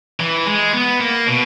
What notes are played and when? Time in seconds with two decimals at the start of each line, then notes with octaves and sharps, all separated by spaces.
0.20 E3
0.47 G#3
0.73 B3
1.00 A#3
1.28 B2